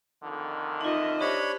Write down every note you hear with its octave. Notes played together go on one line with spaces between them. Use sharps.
F2 D3 D#3
D#4 F4 D#5 E5
D4 G4 C5 C#5 B5